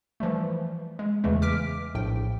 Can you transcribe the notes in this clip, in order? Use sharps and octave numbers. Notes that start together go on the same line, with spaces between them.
E3 F3 G3 A3
G#3
E2 C#3 E3 G#3 A3
D6 F6 B6 D7
A#1 A2 G5